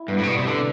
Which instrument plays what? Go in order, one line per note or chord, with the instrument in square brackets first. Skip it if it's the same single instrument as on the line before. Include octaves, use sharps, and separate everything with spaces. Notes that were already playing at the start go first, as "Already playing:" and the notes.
Already playing: [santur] E4
[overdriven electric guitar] G2 [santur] B3
[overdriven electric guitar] A2
C3
[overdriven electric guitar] B2 [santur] D5
[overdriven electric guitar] C3
[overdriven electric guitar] D3 [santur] D4